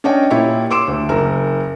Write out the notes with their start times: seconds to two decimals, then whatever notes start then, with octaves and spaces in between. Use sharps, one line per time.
0.04 C#4 D4 C#5 D#5 G5
0.30 A#2 E4 G4 C#5
0.70 C6 D6 E6 D7 E7
0.87 D2
1.09 F#1 A#4